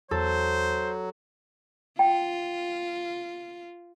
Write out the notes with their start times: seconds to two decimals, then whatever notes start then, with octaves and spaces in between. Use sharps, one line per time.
0.11 E2 F#3 A4 C5
1.99 F4 G5